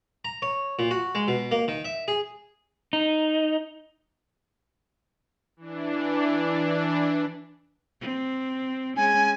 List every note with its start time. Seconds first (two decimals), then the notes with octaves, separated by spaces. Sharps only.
0.25 A#5
0.42 C#5
0.79 A#2
0.91 F#4
1.15 G#3
1.28 B2
1.51 A#3
1.68 D#3
1.85 E5
2.08 G#4
2.93 D#4
5.57 E3 D4
8.01 C4
8.97 G#3 C#4 G#5